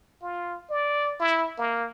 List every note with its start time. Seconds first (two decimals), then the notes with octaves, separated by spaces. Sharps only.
0.22 F4
0.70 D5
1.19 E4
1.58 A#3